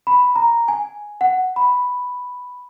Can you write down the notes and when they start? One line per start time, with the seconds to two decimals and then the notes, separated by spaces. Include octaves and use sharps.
0.07 B5
0.36 A#5
0.68 G#5
1.21 F#5
1.56 B5